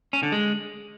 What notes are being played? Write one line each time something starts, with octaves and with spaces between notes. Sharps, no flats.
C#4
D3
G#3